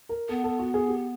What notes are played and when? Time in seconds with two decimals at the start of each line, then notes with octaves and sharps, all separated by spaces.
0.09 A#4
0.29 B3 A4
0.44 A4
0.59 F#4
0.74 G#4
0.88 G4